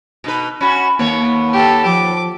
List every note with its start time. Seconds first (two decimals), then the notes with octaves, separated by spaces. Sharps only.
0.24 B2 D#4 B4
0.61 C#4 F#4 B5
0.99 D#2 A#3 B3 C#5
1.53 G4 A4
1.85 F3 D6